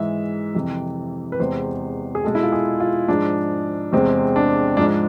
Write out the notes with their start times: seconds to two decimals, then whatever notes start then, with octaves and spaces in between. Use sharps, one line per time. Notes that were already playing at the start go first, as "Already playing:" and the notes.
Already playing: G#2 E3 G#3 E5
0.54 F2 C3 E3
1.32 B4
1.40 E2 C3 G#3 C5
2.15 G#4
2.24 B2 G#3 A4
2.35 E4
2.43 F4
2.52 G#4
2.80 F4
3.08 G#2 F3 G#3 D4
3.92 E2 C3 G#3 C4
4.36 D4
4.77 G#2 F3 G#3 D4